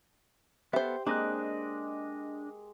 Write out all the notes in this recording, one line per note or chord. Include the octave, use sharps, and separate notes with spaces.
B3 G4 A4 C5 E5
G#3 A#3 C4 D4 D#5 D6 F#6